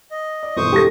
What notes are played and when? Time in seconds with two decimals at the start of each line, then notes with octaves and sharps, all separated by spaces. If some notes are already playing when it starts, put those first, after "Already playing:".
0.11 D#5
0.43 D5
0.56 G1 B2 E3 C5 C#6 D#6
0.72 E1 F#3 D4 G4 A4 A#6